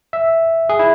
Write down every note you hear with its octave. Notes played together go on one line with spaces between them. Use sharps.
E5
G#4
E4